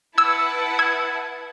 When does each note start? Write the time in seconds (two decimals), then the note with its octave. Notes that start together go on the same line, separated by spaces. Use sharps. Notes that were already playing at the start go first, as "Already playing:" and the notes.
0.17 E4 B4 F#5 A5 E6 G#6
0.79 E6 G#6